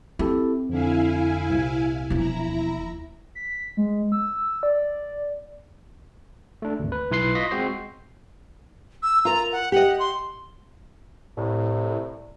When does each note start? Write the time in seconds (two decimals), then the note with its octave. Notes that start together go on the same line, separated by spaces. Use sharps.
0.19 C4 E4 G4 A4
0.70 F2 D3 E4 F5 G#5
1.49 C2 A#2
2.10 E1 F3 E4 A#5
2.47 D#2
3.35 B6
3.77 G#3
4.12 E6
4.63 D5
6.62 A3 D4
6.79 G#1 D2
6.92 B4
7.11 B1 E4 B4 C6 C7
7.35 F4 D#5 C#6 A#6 B6
7.51 G#3 C4 F#4 C5 C7
9.03 E6
9.25 F4 A#4 A#5
9.52 F#5
9.72 G4 D#5 F#5
9.99 C6
11.37 C2 A2